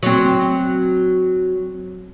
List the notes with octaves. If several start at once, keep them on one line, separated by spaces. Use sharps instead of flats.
F#3 C4